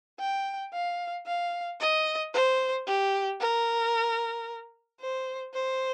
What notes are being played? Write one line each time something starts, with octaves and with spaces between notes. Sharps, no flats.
G5
F5
F5
D#5
C5
G4
A#4
C5
C5